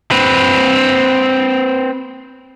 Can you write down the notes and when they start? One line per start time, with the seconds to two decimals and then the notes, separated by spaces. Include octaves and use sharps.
0.11 C4 B4